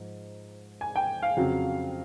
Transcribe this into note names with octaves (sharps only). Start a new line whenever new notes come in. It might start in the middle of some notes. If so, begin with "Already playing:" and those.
Already playing: G#2 F3
G#5
G5
F5
F2 C#3 F#3